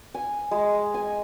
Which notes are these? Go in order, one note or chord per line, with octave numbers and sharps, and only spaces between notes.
G#5
G#3
G#5